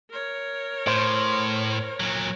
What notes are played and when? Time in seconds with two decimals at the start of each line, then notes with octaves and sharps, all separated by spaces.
0.10 A#4 C#5
0.87 A2 C5
2.00 A#2 F#3